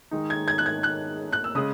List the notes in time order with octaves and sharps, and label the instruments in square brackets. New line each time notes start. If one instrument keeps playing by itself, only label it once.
[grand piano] D#3 G#3 D#4
[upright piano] G#6
G#6
F#6
G#6
F#6
F#6
E6
[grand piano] C#3 G#3 [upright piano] D#6